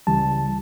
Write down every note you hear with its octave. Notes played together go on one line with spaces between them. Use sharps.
C#2 C#3 E3 G3 A5